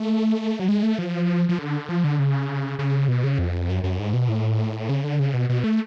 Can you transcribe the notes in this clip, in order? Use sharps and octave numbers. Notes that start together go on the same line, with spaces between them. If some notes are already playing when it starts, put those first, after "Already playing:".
Already playing: A3
F#3
G#3
A3
F3
F3
D3
F3
D3
C#3
C#3
B2
C#3
F2
F#2
F#2
G#2
B2
A2
C#3
D3
C#3
B2
B2
A3